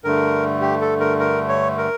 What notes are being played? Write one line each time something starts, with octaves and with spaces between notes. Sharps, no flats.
G2 D3 A3 A#4
G4
A4
A#4
A#4
C#5
A#4